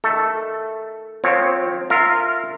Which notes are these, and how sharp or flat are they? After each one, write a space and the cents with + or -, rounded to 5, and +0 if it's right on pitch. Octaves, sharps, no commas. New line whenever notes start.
D#3 +0 A3 +0 A4 +0
F3 +20 C4 +0 C#5 -5
F4 +0 A#4 -20 E5 +0